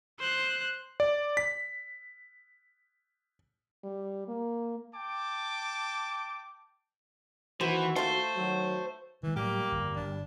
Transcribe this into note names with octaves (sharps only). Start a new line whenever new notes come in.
C5 F#6
D5
B6
G3
A#3
G5 A5 D6
D#2 E3 F#4 C5
A3 F4 C5
D#3 F#3
D#3 E3 G#3
A2 F#3 G3 A#3 G4
G1 F2
G1 D4